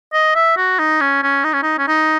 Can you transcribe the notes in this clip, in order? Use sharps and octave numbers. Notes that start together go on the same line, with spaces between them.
D#5
E5
F#4
D#4
C#4
C#4
D#4
C#4
D#4
C#4
D#4